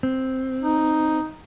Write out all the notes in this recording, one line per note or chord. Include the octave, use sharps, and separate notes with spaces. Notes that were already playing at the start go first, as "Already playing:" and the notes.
C4
D#4